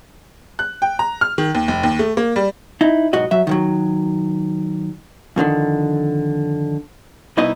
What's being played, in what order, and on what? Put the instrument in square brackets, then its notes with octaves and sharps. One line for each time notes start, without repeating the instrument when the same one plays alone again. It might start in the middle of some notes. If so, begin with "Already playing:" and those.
[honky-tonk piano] F#6
G5
A#5
F6
D#3
D#2
F1
D#2
A3
A#3
G3
[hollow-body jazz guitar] D#4 E4
B1 G#2 F#4 D#5
F#3 E5
D#3 F3 F#3
F2 B2 D3 D#3
C2 B2 D#4 E4 D#5